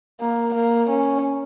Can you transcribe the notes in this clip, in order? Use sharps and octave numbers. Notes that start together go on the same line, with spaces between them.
A#3
A#3
C#4